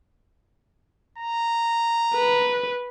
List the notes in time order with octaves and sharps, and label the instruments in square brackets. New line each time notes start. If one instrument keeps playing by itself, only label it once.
[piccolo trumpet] A#5
[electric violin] B4